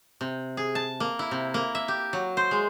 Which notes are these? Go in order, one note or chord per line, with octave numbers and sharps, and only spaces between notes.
C3
G#4
A5
A#3
E4
C3
A#3
E5
G4
F#3
C5
G#3